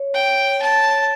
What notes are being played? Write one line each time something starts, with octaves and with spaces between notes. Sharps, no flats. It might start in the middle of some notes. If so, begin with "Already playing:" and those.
Already playing: C#5
G5
A5